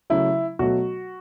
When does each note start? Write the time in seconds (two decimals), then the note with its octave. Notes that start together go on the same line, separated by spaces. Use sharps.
0.10 C#3 F#3 A3 E4
0.59 B2 F#3 A3 F#4